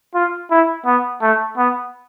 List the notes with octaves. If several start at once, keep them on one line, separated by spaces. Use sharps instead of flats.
F4
E4
B3
A3
B3